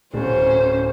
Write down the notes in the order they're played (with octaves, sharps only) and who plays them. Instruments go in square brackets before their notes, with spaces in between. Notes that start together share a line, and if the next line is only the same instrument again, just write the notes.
[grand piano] D1 [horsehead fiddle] C#4 C5